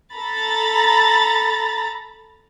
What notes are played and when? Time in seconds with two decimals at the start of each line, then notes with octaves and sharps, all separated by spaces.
0.14 A4 A#5 B5 A6